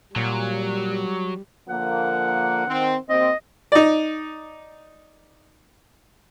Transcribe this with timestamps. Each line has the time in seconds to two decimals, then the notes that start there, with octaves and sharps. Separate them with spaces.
0.16 A#2 F#3 G3
1.69 D3 F3 A#3 F#5
2.68 D#3 C4
3.09 D#2 C4 D#5
3.72 D#4 D5